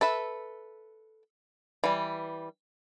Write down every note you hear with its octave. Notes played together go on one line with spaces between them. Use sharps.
A4 B4 E5
E3 G3